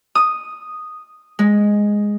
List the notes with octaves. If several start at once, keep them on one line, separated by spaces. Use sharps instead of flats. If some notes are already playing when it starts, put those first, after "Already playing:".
D#6
G#3